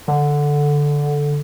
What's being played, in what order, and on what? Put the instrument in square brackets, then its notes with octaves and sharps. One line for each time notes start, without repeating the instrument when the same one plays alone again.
[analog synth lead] D3